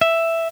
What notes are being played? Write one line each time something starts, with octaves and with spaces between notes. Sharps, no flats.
E5